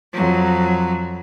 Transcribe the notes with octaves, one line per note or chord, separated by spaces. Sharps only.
F2 F#3